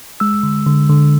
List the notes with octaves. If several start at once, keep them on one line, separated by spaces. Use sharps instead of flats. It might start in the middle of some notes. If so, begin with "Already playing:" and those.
G#3 E6
D3
D3
D3